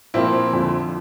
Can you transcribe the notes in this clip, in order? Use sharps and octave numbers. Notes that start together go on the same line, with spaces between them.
A#2 F3 A#3 C4 E4
F2 D3 F3